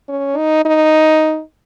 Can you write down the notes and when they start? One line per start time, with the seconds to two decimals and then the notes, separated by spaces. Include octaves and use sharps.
0.09 C#4
0.37 D#4
0.65 D#4